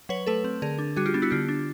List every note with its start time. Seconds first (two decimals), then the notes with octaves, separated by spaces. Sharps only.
0.09 F#3 B4 C#5
0.27 A3 A4 B4
0.44 C4
0.62 D3 G#4 A#4
0.79 D4
0.96 G3 F#4 G#4
1.06 F4 G4
1.14 B3 D4
1.22 E4 F#4
1.31 D3 F4 G4
1.49 D4